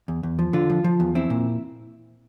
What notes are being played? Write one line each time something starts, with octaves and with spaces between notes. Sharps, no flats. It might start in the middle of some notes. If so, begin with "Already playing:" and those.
E2
E2
F3
D3 F4
F3
F3
E2
C4 E4
A#2